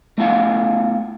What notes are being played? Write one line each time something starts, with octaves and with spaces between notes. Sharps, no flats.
A3 B3 E4 F5 F#5